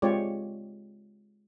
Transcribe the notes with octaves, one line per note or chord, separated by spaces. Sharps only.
G#3 C4 F4 G4 C#5 D5